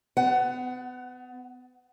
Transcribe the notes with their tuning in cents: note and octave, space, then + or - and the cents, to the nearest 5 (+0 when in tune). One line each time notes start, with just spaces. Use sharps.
B3 +35 F#5 +15